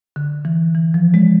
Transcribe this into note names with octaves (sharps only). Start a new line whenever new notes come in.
D3
E3
E3
F3
G#3